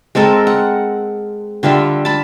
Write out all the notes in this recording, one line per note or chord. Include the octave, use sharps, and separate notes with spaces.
G#3 C4 A4 A#4
F#5
D3 G3 F4 E5
A5 B5